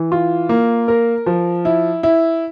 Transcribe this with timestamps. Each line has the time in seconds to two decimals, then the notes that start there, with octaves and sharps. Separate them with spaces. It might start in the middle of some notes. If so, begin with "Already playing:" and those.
Already playing: E3
0.12 F4
0.49 A#3
0.88 A#4
1.26 F3
1.65 E4
2.03 E4